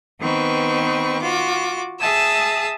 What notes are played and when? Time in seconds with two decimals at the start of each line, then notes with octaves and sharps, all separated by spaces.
0.20 D#3 B3 C4 B4 C#6
1.21 F4 F#4 D6
1.99 G#4 E5 A5 D#6 E6